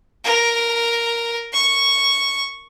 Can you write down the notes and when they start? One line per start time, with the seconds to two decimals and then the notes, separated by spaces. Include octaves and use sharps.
0.25 A#4
1.53 C#6